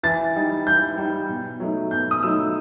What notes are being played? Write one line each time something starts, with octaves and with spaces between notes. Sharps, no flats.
E3 A6
G3 D#4
E3 G6
G3 D#4
B2
F#3 A3 D#4
B2 G6
D#6
F#3 A3 D#4 E6